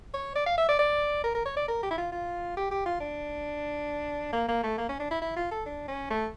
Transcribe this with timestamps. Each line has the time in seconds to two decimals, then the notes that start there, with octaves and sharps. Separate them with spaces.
0.14 C#5
0.36 D5
0.46 F5
0.58 E5
0.69 D5
0.79 D5
1.24 A#4
1.35 A#4
1.46 C#5
1.57 D5
1.68 A#4
1.83 G4
1.91 E4
1.98 F4
2.12 F4
2.57 G4
2.71 G4
2.86 F4
3.00 D4
4.33 A#3
4.48 A#3
4.63 A3
4.78 A#3
4.89 C#4
5.00 D4
5.11 E4
5.22 E4
5.36 F4
5.51 A4
5.66 D4
5.88 C#4
6.10 A3